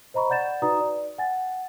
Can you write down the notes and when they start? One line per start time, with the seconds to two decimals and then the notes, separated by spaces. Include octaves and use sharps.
0.14 C5 D#5 A#5 B5 C#6
0.29 D5 F#5 G6 A6 E7
0.62 D#4 F#4 B4 D5 A#5 D#6
0.81 D5
1.18 F#5 G#5 A6